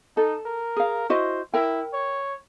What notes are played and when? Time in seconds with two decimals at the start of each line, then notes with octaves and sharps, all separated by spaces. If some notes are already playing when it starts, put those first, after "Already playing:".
0.17 D#4 A4
0.46 A#4
0.76 G#4 F5
1.10 E4 F#4 C5 D#5
1.54 E4 A#4 G5
1.93 C#5